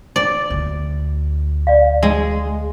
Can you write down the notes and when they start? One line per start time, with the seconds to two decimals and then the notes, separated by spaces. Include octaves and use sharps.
0.16 D5
0.50 D2
1.67 D5 F5
2.03 G#3